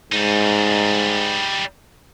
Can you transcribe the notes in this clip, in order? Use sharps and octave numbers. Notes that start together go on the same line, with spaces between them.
G#2 G3 D#4